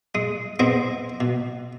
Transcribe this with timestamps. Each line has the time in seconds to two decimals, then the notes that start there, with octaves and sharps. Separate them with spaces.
0.15 G#3 D#6
0.59 B3 C4 G#4 C5 D#5
1.20 B2